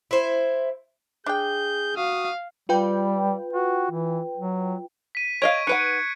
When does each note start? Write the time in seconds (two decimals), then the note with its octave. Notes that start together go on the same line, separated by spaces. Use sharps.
0.11 E4 C5
1.26 D4 G#4 G5 G6
1.96 F#4 F5 D#6
2.69 G3 F4 B4 G5
3.53 F#4
3.91 E3
4.37 F#3
5.15 B6 D#7
5.42 C#5 D#5 F5 C#6 G#6 D7
5.67 D#4 B4 F#5 F#6 C#7 D7